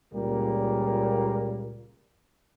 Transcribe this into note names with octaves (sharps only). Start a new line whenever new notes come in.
C#2 A#2 G3 A#3